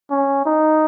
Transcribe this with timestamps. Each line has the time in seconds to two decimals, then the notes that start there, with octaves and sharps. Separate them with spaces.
0.11 C#4
0.46 D#4